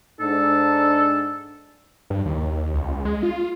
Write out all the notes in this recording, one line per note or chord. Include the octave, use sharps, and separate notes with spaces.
G#2 D4 A4
G2
D#2
C#2
G#3
F4